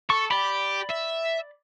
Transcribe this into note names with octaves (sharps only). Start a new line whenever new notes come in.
A4 C#6
G4 D5 B5
E5